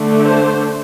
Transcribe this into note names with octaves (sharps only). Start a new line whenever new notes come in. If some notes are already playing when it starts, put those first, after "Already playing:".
Already playing: D3 A3 D4
C5